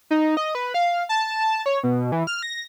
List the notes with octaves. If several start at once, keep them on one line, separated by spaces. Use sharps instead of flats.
D#4
D#5
B4
F5
A5
C#5
B2
E3
F6
A#6